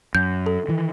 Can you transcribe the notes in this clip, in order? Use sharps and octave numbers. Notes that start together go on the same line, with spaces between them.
F#2 G6
A4
D#3 E3